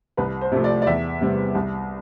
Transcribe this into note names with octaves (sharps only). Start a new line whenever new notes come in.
C2 B4
C5
C3 F3 A3
D5
D5
E2 E5
C3 G3 B3
C2